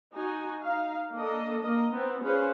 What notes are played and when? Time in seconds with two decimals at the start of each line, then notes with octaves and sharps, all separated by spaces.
0.13 D#4 F#4 G#5
0.61 D#4 F5
1.13 A#3 D4 A4 D#5
1.61 A#3 A#4 D#5
1.91 B3 C4 D#4
2.22 C#4 F4 G#4 B4 C5